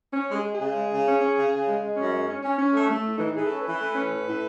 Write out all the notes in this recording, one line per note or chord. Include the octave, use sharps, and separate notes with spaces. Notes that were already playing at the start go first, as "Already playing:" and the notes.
C#4 C#5
G#3
G#4
G#3
G#4
C#3
G#3
C#3
C#4
C#4
C#3
C#3
G#3
G#3
F#2 C#4
G#3
C#4
C#4
C#4
A3
A3
A2
E3 D#4
E3 G#4
C#4 A4
B4
E3
A3
C#4
A2
A2